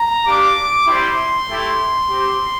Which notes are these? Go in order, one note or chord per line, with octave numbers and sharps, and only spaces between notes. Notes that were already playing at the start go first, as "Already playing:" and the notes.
Already playing: A#5
A#3 D4 G4 D6
G3 C4 E4 G4 C6
A3 E4 G4
C4 G4